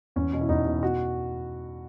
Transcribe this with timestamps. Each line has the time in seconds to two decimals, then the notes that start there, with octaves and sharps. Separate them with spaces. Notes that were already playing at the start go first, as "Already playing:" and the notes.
0.16 E2 C#4
0.33 B2
0.41 E4
0.49 E2 D#4
0.66 B2
0.83 F#4